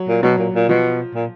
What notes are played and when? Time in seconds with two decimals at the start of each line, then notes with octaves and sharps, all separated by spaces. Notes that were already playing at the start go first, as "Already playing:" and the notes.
Already playing: F#3
0.08 A#2
0.23 B2 F#3
0.38 A#2
0.54 A#2
0.69 B2 F3
1.15 A#2